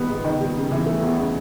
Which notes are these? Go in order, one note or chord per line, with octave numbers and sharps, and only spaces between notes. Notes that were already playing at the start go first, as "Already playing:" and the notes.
Already playing: D#3 G3 B3
G#2
D#3
G3
C#3
E3
A3
E2
C#3